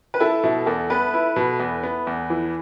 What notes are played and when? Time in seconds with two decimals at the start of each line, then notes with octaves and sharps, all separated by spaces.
0.14 B4
0.20 E4 A4
0.43 B2 E4
0.66 E2 A4
0.90 B3 B4
1.14 E4
1.36 B2
1.60 E2
1.83 B3
2.07 E2
2.30 E3